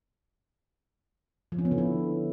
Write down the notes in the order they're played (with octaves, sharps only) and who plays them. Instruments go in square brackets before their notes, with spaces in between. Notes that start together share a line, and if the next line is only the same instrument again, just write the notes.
[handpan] F3
C#4
B3
D3
E4